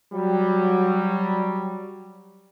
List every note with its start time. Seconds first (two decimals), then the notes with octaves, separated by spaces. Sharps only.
0.13 F#3 G3